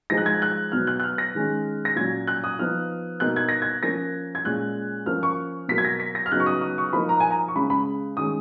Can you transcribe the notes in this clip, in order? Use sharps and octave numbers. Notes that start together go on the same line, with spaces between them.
F3 G#3 D#4 A#6
F#6
G#6
F#6
B2 F#3 B3 F6
F#6
F#6
F6
A#6
D#3 G#3 C#4
A#6
A#2 F#3 C#4 G#6
F#6
D#6
F3 B3 D#4 F6
B2 A#3 D#4 F#6
G#6
A#6
G#6
F3 A#3 C#4 A#6
G#6
A#2 G#3 C#4 F#6
F3 A#3 C#4 F6
C#6
B2 F#3 A#3 B6
G#6
A#6
B6
A#6
F6
C#3 F#3 B3 D#4 F#6
C#6
D#6
D#6
C#6
F3 A#3 D#4 B5
A#5
G#5
A#5
C#6
C#3 G#3 C#4 B5
B5
D#3 G#3 C#4 D#6